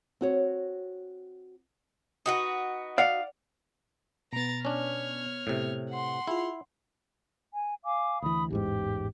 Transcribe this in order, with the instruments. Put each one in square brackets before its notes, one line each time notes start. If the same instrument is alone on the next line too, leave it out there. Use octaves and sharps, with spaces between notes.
[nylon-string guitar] C4 F#4 C#5
[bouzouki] D#4 F#4 B4
[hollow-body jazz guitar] D5 F#5 [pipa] F5
[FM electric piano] B2 B3 [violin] A#5 A6
[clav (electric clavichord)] C#4 D4 [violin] C#5 F6
[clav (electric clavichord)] A2 C3
[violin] F#5 C6
[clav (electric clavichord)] E4 [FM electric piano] F4 G#4
[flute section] G#5
F5 G#5 D6
[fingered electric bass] D2 E3 [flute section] B5 D#6
[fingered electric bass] A1 E2 G#2 [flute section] G4